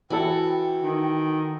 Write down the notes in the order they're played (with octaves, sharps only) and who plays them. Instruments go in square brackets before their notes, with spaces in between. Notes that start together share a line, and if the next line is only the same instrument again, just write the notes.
[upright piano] E3 E4 A4 [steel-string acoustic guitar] F#4 [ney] G5
[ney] G5
[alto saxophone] D#3